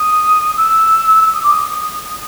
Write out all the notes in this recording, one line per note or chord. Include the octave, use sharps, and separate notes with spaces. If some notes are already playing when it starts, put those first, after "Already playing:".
Already playing: D#6
E6
D#6
D6
D#6
D#6